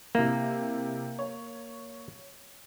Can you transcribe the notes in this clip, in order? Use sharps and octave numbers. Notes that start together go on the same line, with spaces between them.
C3 A#3 E4
C#5